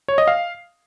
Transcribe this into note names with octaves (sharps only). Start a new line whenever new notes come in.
C#5
D#5
F5